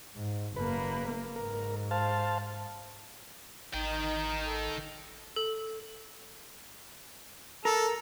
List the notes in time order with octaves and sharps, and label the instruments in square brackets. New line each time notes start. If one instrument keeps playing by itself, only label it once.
[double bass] G#2
[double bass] F#1 A#3 [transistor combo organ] B4
[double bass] G#2 [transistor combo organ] A#4
[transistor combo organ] C5 F5 A5
[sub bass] G#1 [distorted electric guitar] D#3 G5 [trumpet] D#4
[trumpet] A4
[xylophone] A4
[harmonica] A4 [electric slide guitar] A#4